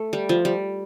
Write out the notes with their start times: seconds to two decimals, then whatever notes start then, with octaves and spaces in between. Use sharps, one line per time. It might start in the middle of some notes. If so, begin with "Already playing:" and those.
Already playing: A3
0.13 G3
0.29 F3
0.45 G3